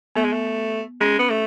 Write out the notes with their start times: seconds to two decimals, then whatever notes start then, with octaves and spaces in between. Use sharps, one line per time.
0.16 A3 B3
0.24 G#3
0.32 A3
1.01 G#3 C#4
1.19 B3
1.30 A3